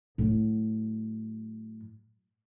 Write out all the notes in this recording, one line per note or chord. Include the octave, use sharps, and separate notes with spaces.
A2 F#3